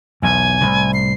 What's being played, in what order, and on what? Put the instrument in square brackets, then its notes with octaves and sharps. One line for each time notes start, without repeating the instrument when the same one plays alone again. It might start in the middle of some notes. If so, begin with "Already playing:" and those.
[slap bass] B1 E2 [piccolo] G#5
[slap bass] C2 A2
[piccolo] C7